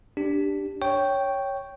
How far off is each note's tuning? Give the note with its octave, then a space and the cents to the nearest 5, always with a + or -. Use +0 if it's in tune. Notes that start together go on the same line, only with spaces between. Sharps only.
D4 +0 G4 +0
C#5 +0 G5 -5 C#6 +0